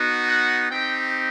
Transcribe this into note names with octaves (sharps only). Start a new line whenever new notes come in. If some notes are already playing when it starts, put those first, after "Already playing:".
Already playing: B3 D#4 F#4
F#5
C4 D#4 G4 G5